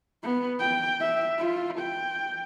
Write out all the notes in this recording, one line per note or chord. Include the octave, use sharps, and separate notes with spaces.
B3
G5
E5
F4
G5